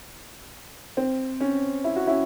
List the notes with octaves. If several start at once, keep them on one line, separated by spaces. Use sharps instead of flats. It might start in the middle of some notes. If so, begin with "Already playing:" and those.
C4
C#4
E4
F#4
C#4 E4